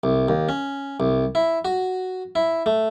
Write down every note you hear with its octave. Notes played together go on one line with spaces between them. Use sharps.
C2
D#2
C#4
C2
E4
F#4
E4
A3